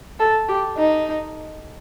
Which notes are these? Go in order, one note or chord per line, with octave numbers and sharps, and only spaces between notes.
A4
G4
D#4